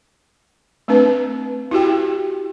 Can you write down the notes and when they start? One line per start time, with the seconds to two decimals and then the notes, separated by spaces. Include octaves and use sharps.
0.88 A3 C4 D4 B4
1.71 E4 F#4 G4 G5